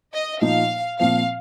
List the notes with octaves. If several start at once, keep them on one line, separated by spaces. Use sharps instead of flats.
D#5
A#2 F3 A#3 D#4 F5
A#2 F3 C4 F5